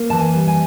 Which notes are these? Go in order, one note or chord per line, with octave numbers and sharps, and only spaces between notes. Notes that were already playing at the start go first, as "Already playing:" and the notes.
Already playing: A#3
E3 A5
G#5
G3
G#5